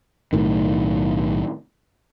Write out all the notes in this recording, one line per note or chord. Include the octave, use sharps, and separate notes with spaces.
B1 A2 D#3